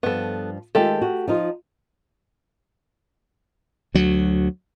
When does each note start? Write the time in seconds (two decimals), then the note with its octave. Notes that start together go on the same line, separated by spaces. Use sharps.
0.03 G2 F3 B3 A4
0.75 D#3 G#3 A3 F4 G4 A4
1.02 F#4
1.27 F3 D#4 F4
3.95 D2 F#3